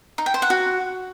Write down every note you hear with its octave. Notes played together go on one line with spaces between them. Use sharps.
D#4
G5
C5
F#5
F#4